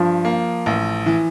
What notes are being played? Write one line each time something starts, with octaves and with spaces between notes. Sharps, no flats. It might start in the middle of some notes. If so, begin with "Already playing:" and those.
Already playing: G2 F3
A#3
A1
E3